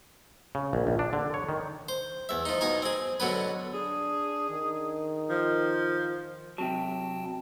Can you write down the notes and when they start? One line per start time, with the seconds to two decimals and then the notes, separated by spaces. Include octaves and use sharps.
0.55 C#3
0.73 A#1
0.87 A#1
0.99 D4
1.13 D3
1.34 C#5
1.49 D#3
1.89 C5
2.29 E2 E5
2.45 F3 D#4
2.61 B2 D#4 G#5 A#5
2.82 C4 G#4
3.20 B2 D3 F#3 B3 B4
3.74 D4 G#4
4.50 D#3
5.29 F3
6.58 C3 F#3 G5 A5